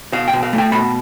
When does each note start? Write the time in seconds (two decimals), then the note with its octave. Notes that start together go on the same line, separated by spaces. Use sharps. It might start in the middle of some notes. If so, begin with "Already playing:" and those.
0.13 B2 F5
0.28 G5
0.33 B2
0.43 F5
0.53 A3
0.58 G5
0.72 B2 B5